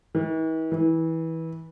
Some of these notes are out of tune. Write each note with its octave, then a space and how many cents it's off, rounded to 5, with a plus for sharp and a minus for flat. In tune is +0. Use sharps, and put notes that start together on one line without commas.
E3 -45
E3 -20